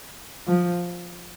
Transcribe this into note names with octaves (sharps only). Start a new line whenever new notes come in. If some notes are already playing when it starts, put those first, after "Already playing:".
F3